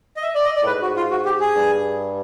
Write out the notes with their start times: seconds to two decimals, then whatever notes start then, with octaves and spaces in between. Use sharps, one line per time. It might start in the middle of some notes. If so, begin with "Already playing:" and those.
0.17 D#5
0.22 E5
0.35 D5
0.45 D#5
0.56 D5
0.63 A2
0.66 G#2 B4
0.82 F#4
0.97 F4
1.11 F#4
1.25 G4
1.40 G#4
1.55 G2